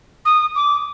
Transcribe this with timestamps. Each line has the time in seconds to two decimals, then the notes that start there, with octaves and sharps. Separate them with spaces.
0.25 D#6
0.55 D6